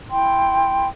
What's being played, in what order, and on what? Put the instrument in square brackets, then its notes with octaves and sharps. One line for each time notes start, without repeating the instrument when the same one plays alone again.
[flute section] E4 G5 C6